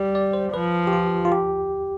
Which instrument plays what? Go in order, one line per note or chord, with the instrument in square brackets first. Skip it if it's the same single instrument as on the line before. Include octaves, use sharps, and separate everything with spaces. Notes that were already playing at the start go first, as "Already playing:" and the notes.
Already playing: [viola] G3 [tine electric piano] D5
[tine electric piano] D5
C5
[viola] F3 [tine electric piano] B4
[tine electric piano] G4
F4
F4
G4